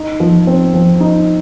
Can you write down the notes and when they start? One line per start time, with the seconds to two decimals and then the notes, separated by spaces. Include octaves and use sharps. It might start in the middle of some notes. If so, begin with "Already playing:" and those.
Already playing: D#4
0.20 F3
0.47 C4
0.74 F3
1.01 D#4